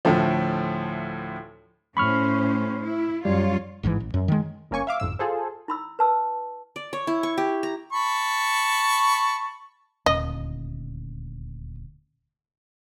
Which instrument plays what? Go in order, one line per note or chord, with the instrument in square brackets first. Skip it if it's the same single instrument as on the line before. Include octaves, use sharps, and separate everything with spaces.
[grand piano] D2 A2 F3
[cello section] A2 C#4 C5 [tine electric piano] B5 C#6 F6
[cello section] E4
[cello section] F#2 F4 C#5 [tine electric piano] G3
[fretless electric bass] A1 G#2 B2 E3
A1
F#2
D#3 G#3
[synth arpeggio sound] G1 A#3 C#4 G#5 C#6
E5 F5 D6
G1 F2 G#2 E6
F4 G#4 A4 C5
[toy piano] E4 B5 E6
B4 A5 E6
[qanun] D5
C#5
E4
C#6
G4
A#5
[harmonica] A5 B5 C#6
[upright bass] D#1 D2 [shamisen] D#5